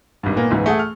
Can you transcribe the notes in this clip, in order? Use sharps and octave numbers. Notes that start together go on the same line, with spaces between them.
G#1 G2
A#2 A#3 B3
C#2 G#2 E3
A3 G#4 F#5
F6